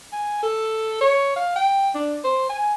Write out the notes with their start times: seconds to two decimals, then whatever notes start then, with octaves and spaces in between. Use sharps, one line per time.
0.13 G#5
0.43 A4
1.01 C#5
1.36 F5
1.56 G5
1.95 D4
2.24 C5
2.50 G#5